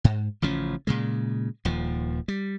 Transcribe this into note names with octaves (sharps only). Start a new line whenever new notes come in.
G#2
A1 C#3 F3 C#4
A#2 C#3 G#3
D#1 D#2 F3
G3